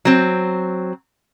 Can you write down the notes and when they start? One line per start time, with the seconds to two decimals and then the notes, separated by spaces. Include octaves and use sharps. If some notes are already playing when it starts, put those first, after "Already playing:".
0.05 F#3 C4